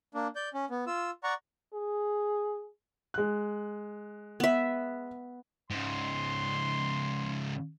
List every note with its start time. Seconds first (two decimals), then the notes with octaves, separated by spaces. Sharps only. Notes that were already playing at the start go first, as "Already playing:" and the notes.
0.15 A#3 D4
0.36 D5 G6
0.54 C#4
0.71 B3
0.87 F4 E6
1.24 D5 F#5 A#5 C#6
1.74 G#4
3.14 G#3 F#6
4.40 B3 E5
5.70 G#2 C#3 C6